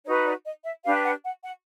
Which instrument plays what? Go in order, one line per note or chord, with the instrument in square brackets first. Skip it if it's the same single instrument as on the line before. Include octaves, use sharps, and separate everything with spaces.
[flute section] D#4 F#4 B4 C#5
D5
D#5
E5
D4 G4 B4 F5
F#5
F#5
F#5